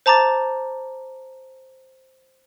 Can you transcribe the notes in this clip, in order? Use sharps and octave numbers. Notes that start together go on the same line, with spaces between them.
C5 A5 A#5 D6 A6